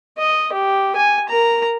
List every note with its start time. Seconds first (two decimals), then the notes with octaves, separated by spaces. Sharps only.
0.18 D#5
0.52 G4
0.96 G#5
1.28 A#4 A#5